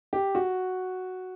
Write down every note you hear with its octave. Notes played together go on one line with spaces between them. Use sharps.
G4
F#4